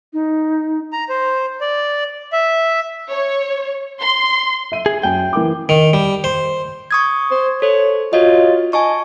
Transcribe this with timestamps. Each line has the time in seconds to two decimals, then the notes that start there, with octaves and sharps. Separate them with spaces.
0.13 D#4
0.93 A#5
1.09 C5
1.61 D5
2.32 E5
3.11 C#5
4.00 C6
4.72 E5 D#7
4.86 G#4
5.03 F#2 G5 G#5
5.33 E3 A#4 D6
5.69 D#3
5.93 G3
6.24 C5
6.91 C#6 D#6 G#6
7.31 C5
7.62 A4 C5 C#5
8.13 F4 F#4 C#5 D#5
8.73 D#5 G#5 A5 C#6